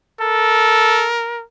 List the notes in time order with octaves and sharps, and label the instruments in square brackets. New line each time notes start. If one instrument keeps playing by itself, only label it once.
[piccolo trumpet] A4 [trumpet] A#4